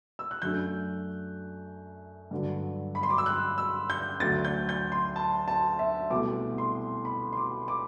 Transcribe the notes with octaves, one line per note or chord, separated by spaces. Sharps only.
E6
F#6
F#2 F#3 A3 D4 G6
G2 D3 F#3
B5
C6
D6
E6
F#6
E6
G6
D2 D3 F#3 A6
G6
G6
C6
A5
A5
E5
C2 B2 A3 D6
C6
B5
C6
D6
D6